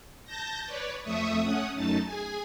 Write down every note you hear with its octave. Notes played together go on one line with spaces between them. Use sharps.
A5 G6 A#6
B4 C#5 D5
F2 A3 E5 C#6 D#6
A3 C#4 F#5 D#6
F#2 A3 D#4 A5 A6
G#4 G#5